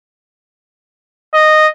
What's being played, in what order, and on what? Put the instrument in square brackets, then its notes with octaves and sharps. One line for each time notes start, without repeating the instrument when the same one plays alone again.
[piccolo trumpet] D#5